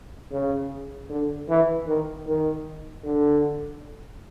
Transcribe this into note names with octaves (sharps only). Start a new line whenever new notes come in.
C#3
D3
E3
D#3
D#3
D3